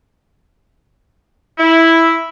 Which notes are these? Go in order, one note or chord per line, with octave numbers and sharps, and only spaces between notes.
E4